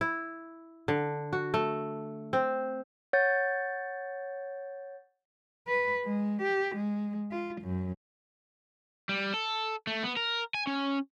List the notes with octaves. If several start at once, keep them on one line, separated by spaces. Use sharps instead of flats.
E4
D3
F#4
A3
C4
C#5 F#5 G6 A6
B4
G#3
G4
G#3
F4
F#2
G3
A4
A3
B3
A#4
G#5
C#4